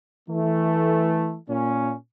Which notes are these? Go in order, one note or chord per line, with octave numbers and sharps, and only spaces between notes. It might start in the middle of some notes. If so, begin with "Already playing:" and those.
E3 A3
A#2 C#4